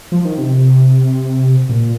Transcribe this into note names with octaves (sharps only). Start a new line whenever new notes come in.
F3
D#3
C3
A#2